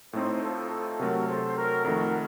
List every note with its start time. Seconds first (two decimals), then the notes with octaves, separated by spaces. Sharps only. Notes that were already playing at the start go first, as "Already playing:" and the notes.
0.13 A2 A3 C4 D#4 A4 C5
0.42 F4 A4
0.70 F4 A4
0.99 C3 F#3 A3 F#4 A#4
1.28 A4 C5
1.56 F#4 A#4
1.85 F2 D#3 A3 F#4 A#4